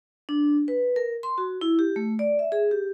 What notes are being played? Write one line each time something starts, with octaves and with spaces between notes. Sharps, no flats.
D4
B4
A#4
C6
F#4
E4
G4
A3
D5
E5
G#4
G4